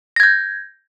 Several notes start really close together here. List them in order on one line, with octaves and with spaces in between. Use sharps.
A#6 G#6 G6